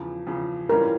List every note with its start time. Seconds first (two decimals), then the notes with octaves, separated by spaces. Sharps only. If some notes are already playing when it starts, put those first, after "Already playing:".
Already playing: E2 C#3 F3
0.27 E2 C#3 F3
0.69 A2 E3 G3 C#4 F4 A#4